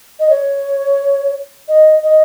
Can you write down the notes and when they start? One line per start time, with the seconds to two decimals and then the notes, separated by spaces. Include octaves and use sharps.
0.19 D#5
0.29 C#5
1.68 D#5
2.03 D#5